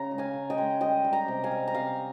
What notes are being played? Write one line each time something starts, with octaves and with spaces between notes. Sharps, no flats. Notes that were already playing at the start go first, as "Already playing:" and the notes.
Already playing: C#3 A#5
G#3
F5 G#5
C#3
D#5 G5
G#3
G3 D#5 G5
G3
G5 A#5
C3
F5 G#5
G3
A#5
C3 F5 G#5